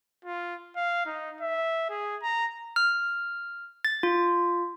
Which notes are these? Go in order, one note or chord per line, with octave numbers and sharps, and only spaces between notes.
F4
F5
D#4
E5
G#4
A#5
F6
A6
F4